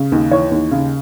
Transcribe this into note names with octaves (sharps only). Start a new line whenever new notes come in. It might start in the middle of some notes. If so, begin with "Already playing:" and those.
Already playing: C#3
D#2
E3 C#5
D#2
C#3